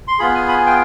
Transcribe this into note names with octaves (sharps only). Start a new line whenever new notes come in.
C6
B3 F4 G#4 B5
G#5
B5
G#5
G5